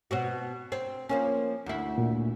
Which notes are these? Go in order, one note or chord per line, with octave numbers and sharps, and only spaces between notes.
B2 C4 F#4
C4
F3 A#3 C#4
D2 E4
A#2